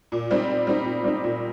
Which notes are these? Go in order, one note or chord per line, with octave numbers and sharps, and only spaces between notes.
A#2
G3 C4 D#4
A#2
G3 C4 D#4
A#2
G3 C4 D#4
A#2